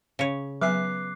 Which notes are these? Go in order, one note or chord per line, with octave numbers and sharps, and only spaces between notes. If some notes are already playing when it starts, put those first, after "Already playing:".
C#3 C#5
F#3 B3 E5 G#5 D6 F#6 C7